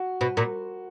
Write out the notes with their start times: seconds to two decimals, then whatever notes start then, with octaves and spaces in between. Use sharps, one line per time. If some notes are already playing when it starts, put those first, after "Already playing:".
Already playing: F#4
0.21 B2
0.37 A#2